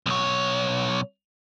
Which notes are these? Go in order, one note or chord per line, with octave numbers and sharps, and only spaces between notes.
B1 C#5